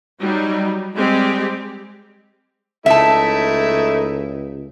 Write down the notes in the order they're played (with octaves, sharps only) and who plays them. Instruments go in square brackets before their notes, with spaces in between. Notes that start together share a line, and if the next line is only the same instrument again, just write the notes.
[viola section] F#3 G3 D#4
G3 G#3 C4 G4
[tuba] C#2 [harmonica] A3 D#4 E4 [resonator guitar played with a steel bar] E5 A5